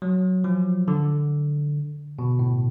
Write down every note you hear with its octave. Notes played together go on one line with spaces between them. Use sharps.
F#3
F3
D3
B2
A2